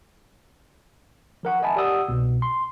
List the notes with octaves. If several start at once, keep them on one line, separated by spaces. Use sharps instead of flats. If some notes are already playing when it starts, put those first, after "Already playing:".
F3 A#4 F#5 C#6
A#4 D#5 E5 G#5 A5 B5
G4 D5 F#5 D#6 E6
C2 B2
C6